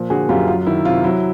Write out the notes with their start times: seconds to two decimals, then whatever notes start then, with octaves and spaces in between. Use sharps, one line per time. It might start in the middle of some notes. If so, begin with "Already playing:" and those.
Already playing: A#2 F3
0.10 D3 F#4 G#4
0.29 F#2 F4 G4
0.48 F#3 F4
0.66 D#3 E4
0.85 C3 F4
1.04 F#3 E4